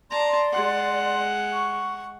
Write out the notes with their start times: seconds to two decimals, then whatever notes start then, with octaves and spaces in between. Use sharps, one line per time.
0.11 D5 A5 A#5 C6
0.52 G#3 F#5
1.53 C#6